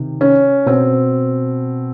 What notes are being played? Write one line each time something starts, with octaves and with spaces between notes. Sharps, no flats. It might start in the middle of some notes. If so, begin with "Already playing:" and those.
Already playing: C3 D#3
C#4
B2 C4